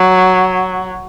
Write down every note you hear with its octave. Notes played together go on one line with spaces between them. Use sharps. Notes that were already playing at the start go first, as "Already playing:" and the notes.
Already playing: F#3